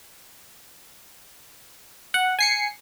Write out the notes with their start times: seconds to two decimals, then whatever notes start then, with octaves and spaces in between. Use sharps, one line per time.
2.14 F#5
2.39 G#5 C7 C#7